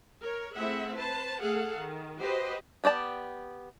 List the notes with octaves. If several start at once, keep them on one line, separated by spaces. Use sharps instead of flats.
A#4 C#5
A3 C4 E4 G#4 E5 F#5
B4 C5 A5
A3 G#4 A4 F5 F#5
D#3
F#4 G4 B4 C5 D#5
B3 G4 D5 A5